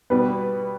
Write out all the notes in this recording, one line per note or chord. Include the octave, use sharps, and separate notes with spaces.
B2 G3 B3 B4